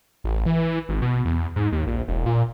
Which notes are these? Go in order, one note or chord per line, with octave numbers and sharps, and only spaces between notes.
A1
E3
G#1
B2
E2
G#2
D#2
A#1
E1
A#2